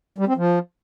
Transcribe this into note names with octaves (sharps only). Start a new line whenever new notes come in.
G3
C4
F3